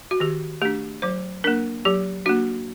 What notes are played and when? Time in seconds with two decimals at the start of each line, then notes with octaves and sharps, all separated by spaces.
0.11 F#4
0.20 D#3 G4
0.62 A3 D4 G4
1.02 F#3 C5
1.44 A#3 D4 A#4
1.85 F#3 G4
2.26 A#3 D4 F#4